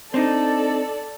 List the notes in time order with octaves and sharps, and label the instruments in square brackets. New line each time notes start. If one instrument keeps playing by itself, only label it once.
[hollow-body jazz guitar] C4 D4 D#4 [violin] A4 D5